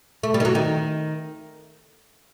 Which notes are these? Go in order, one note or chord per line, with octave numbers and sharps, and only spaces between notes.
A3
G3
D#3
F#3
D#3